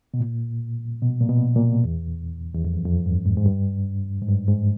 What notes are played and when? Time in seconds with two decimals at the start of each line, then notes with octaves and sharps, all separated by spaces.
0.14 B2
0.20 A#2
1.02 B2
1.20 A#2
1.29 B2
1.56 A#2
1.84 E2
2.55 E2
2.64 F2
2.85 F2
3.06 G2
3.26 G#2
3.37 G#2
3.46 G2
4.21 G#2
4.28 G2
4.48 G#2